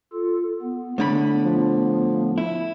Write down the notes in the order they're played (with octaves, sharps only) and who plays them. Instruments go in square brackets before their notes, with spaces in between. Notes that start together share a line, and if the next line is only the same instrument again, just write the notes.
[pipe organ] F4 A4
B3
[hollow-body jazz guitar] A2 D3 B5 [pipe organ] B3
[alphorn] F3
[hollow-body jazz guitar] E4